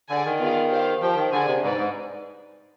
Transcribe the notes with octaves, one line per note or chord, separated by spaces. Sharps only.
D3 G#4 D5 G#5
D#3
B3 F4 G#4 D5 F5
G4 C5 F5
F3 G4 C5 G5
D#3
D3 D4 G#4 D5 G#5
C3
G#2 D#4 B4 D5
G#2